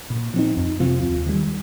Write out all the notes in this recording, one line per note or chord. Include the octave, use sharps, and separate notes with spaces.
A#2
F3 C4 D#4
F2
C3 F3 C4 F4
D#2
D#3 G3